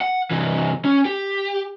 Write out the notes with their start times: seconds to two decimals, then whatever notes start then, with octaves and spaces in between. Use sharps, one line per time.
0.01 F#5
0.31 C3 E3
0.85 C#4
1.05 G4